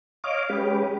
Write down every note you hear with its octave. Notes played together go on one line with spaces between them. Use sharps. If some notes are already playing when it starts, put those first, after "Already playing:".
C#5 D#5 F5 D6
G#3 C#4 G4 B4